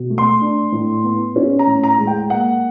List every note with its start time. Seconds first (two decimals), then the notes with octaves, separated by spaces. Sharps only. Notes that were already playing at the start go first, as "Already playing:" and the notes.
Already playing: B2
0.10 A3
0.18 C6
0.41 D4
0.72 A2
1.04 B3
1.36 C#4
1.59 A#5
1.67 A2
1.84 A#5
1.98 G#3
2.07 G5
2.30 A#3 F#5